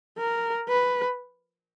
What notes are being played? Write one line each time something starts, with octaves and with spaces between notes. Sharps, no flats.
A#4
B4